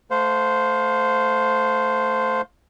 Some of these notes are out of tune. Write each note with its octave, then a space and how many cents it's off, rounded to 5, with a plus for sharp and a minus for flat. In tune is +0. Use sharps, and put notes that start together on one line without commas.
A3 +0 C5 -10 F5 +30